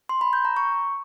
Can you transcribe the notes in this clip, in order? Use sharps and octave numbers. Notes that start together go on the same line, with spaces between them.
C6
B5
G6
A#5
C#6